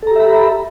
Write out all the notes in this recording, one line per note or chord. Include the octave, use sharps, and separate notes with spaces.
G4 A4 E5 A#5 B5